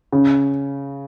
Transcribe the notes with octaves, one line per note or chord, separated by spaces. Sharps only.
C#3